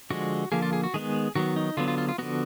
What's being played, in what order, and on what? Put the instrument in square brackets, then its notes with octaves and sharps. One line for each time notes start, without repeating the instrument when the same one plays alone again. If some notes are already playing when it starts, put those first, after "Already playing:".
[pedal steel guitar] D3 F3 G#3 F#4
D3 F3 A#3 G#4
F4
G#4
F#4
D#3 G#3 B3 G#4
D#3 F#3 B3 F#4
D#4
D3 F#3 B3 F4
F4
F4
F4
D3 F3 B3 F#4